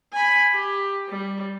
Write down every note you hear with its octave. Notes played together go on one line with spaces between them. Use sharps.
G#5 B5
G4
G3